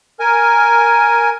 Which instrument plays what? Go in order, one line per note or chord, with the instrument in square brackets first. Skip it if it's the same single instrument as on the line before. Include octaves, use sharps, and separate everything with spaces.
[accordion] A#4 G#5